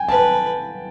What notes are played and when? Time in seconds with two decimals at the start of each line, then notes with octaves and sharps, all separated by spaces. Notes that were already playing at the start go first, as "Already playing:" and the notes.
Already playing: G5 G#5
0.09 B4 A5